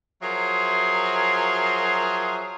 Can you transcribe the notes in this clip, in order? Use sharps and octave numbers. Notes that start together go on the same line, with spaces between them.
F3 F#3 G#4 A#4 E5 C6